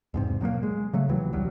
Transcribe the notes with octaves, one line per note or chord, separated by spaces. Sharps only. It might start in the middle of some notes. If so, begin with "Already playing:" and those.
E2 G#2 C3
B2 F#3 G#3 A#3
G#3
C#3 F#3 A3
D#2 C3 E3 F#3
E1 C2 F#3 G3